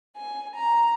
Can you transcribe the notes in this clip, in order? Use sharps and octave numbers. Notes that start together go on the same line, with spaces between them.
G#5
A#5